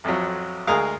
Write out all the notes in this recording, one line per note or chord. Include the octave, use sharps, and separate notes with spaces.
A1 F2 F3 F#3
D2 G#3 G#4 A#4 F5